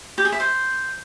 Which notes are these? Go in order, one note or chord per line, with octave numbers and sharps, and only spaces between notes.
G4
G#4
E5
C5